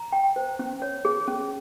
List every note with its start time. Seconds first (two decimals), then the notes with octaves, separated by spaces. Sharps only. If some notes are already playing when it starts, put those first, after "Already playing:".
Already playing: A#5
0.12 G5
0.36 C5
0.59 C#4
0.82 C#5
1.05 G#4
1.28 C#4